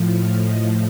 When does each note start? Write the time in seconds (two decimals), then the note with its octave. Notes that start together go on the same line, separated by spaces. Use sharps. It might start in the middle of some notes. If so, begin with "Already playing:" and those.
Already playing: A2 F3
0.14 F5
0.42 D#5